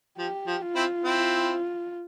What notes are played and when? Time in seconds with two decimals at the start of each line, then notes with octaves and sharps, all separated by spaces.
0.19 F3 G4
0.47 F3
0.61 F4
0.75 C4 E4
1.04 C4 E4